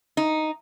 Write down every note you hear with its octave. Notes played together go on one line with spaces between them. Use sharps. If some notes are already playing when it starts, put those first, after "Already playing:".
D#4